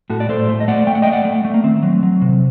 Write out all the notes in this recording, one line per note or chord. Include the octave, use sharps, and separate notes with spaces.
A2 F#4 A4
D5
A2 A4 C5
A3
D#5
A3 D5 F#5
A3 G5
F#5
A3 D#5 G5
D5 F#5
A3
A3
A#3
D#3 C4
F#3
F#3
C3